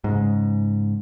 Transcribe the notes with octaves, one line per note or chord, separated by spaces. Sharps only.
G#2 C#3